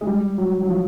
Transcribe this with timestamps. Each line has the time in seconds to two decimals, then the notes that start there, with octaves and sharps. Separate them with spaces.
0.01 G#3
0.07 G3
0.38 F#3
0.62 F#3
0.68 F3